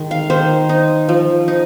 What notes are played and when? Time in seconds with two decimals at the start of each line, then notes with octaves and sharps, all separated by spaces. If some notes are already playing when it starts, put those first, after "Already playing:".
Already playing: D#3 G#3
0.11 F5
0.30 D#3 C5
0.69 D#4
1.09 F3
1.48 D#4